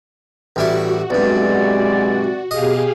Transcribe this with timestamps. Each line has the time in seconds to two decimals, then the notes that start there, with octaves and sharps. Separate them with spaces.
0.56 A1 G3 E4 F#4
1.10 B1 G2 E3 G#3 C4 D5
2.51 B2 G4 G#4 D#5 F5